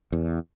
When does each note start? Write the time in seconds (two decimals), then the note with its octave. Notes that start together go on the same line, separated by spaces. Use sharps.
0.12 E2